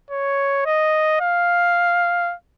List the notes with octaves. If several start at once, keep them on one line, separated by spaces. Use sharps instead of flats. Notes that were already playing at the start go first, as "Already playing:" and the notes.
C#5
D#5
F5